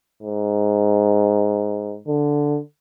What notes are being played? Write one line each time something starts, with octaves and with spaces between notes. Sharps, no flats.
G#2
D3